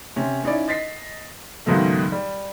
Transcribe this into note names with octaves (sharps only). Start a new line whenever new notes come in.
C3 C#4
C#4 D#4 E4 D5
D#5 A6 B6 C7
C#2 G#2 B2 D#3 F#3 A3
G3